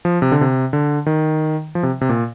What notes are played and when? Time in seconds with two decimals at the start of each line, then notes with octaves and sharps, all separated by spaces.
0.05 F3
0.22 C3
0.32 D3
0.41 C3
0.73 D3
1.06 D#3
1.75 F3
1.83 C3
2.01 C3
2.09 A#2